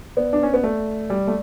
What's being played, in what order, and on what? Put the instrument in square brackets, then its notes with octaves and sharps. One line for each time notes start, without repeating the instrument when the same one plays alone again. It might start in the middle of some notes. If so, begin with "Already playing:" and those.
[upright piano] B3 [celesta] D5
[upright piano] D4
C#4
B3
[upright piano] A3 [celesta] D5
[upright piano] G3 [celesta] D5
[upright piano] A3